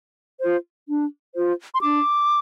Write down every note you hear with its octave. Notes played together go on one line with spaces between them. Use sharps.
F4 C5
D4
F4 C5
C6
D4 D6